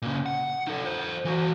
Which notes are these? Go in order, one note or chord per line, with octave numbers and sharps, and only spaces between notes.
A#2 C#3
F#5
D#4 A4
A4 C5
E3 F#4